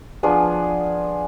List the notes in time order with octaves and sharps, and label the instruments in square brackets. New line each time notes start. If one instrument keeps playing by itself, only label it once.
[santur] F3 B3 D4 G#4